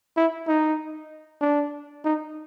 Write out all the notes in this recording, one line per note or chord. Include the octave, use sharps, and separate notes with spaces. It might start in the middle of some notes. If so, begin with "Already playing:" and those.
E4
D#4
D4
D#4